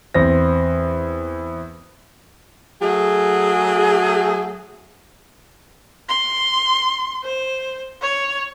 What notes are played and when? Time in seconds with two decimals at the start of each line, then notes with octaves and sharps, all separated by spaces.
0.14 E2 C4 A#6
2.82 F#3 A3 G#4
6.09 C6
7.23 C5
8.02 C#5